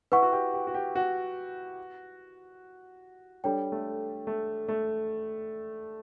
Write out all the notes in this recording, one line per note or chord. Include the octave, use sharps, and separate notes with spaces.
E4 B4 F#5 C#6
F#4
G4
G4
F#4
G4
F#4
G3 D4 A4 C#5 G5
A3
A3
A3